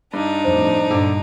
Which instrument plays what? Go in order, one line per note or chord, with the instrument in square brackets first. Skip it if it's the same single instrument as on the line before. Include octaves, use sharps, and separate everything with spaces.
[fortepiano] G2 [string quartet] D4 D#4
[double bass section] F2 A2 [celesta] C5
[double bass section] G2 A#2 [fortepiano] D3